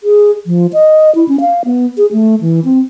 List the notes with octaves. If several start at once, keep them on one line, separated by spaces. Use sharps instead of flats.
G#4
F3
D#5
E4
C#4
F5
B3
G#4
A3
E3
C4